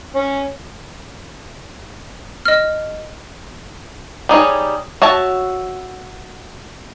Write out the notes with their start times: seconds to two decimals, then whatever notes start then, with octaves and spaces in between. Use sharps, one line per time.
0.15 C#4
2.45 D#5 F6
4.29 G3 D#4 G#4 C#5
5.02 F#4 C#5 E5 A5